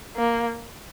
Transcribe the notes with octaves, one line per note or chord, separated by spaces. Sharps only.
A#3